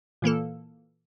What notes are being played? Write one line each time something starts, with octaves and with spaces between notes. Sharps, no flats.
A#2 E3 A#3 A4